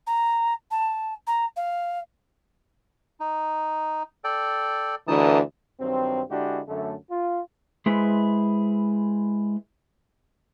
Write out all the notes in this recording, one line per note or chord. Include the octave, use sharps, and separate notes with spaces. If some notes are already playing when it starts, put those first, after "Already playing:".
A#5
A5
A#5
F5
D#4
A4 D5 G5
D2 D3 E3 D#4 A5 D#6
G2 D#3 F#3 C4
D3 G#3 D4 E4 F#4 G4
F#2 D3 A3
F4
G#3 E4 G#4 B4 C5